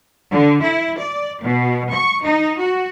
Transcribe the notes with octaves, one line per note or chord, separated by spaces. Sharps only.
D3
E4
D5
B2
C#6
D#4
F#4